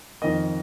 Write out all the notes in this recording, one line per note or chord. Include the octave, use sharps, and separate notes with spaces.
F2 D#3 A#3 D#5